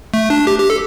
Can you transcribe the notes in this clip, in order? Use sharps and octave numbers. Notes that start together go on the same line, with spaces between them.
A3
D4
G4
G4
A4